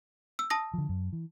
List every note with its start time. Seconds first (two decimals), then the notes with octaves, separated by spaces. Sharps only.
0.39 E6
0.50 A5 D#6 A#6
0.74 D3 F3
0.89 F#2
1.13 E3